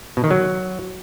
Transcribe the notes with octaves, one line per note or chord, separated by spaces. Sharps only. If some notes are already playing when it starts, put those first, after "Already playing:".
B2
D#3
F#3